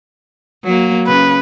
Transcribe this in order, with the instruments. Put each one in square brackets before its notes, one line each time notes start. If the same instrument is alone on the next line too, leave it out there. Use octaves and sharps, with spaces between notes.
[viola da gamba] F#3 A#3
[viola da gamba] C#3 [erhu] B4